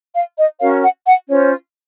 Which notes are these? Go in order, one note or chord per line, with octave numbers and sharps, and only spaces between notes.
F5
D#5
C#4 F#4 A#4 C#5 F5
F#5
F#5
C#4 F4 C5 C#5